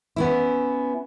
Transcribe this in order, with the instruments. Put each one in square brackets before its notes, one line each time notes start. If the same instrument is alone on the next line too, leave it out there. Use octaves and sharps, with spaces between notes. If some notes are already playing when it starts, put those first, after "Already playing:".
[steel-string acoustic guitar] B3 C#4 E4